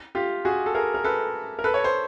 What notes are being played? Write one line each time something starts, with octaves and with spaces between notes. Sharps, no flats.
F4 G4
F#4 G#4
A4
G#4 A#4
A#4
A4 B4
A#4
A4 B4
C#5
C5